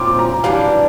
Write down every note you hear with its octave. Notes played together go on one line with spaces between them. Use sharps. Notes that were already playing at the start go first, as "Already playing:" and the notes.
Already playing: A#2 F3 C4 F4 D6
A#5
E3 G3 D4 F5